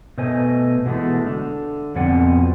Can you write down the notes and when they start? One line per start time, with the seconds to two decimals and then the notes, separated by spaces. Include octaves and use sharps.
0.18 B2 A3 C5 D#5 G#5
0.86 B2 E3 G#3 A3
1.26 D3
1.95 F2 B2 C4 D5 F#5 G#5